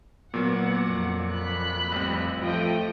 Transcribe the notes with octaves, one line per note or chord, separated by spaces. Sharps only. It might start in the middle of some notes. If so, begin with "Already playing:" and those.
A#2 F#3 A#3 B3 F#5
F2
B5 F#6
A1 G3 C4
F3 A3 D#5 G5